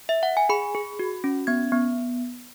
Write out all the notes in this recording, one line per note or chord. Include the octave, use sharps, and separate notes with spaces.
E5
F#5
G#5
G#4 B5
G#4
F#4
C#4
B3 G#6
B3